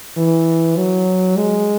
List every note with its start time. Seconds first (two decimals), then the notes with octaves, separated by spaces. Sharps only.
0.17 E3
0.77 F#3
1.37 G#3